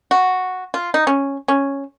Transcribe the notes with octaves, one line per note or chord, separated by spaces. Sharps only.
F#4
F4
D#4
C#4
C#4